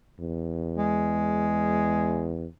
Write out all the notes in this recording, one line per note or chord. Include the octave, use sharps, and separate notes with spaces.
E2
G#3